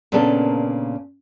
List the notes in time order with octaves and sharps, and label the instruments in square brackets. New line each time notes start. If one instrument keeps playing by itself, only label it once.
[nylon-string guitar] A#2 C#3 A#3 B3 D4 A4